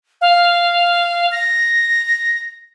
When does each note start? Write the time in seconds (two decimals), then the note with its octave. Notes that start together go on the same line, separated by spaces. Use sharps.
0.21 F5
1.32 A#6